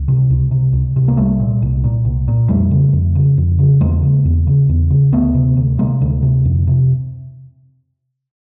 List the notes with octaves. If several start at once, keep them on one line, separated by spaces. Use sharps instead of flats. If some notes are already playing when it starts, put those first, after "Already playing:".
Already playing: C#2
C3
C#2
C3
C#2
C3
A#3
C2 G3 A3
A#2
C2
A#2
C2
A#2
F2 G3 A3
C#3
F2
C#3
F2
C#3
E2 G#3 A#3
C#3
E2
C#3
E2
C#3
D2 A3 B3
C3
D2
C3 G#3 A#3
D2
C3
F2
C3